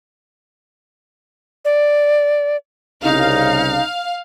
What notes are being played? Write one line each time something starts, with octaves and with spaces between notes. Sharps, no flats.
D5
C2 C#3 D#4 F5